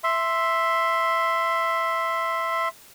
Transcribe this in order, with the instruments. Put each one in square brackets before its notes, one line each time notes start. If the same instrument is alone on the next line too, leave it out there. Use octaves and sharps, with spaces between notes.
[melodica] E5 C6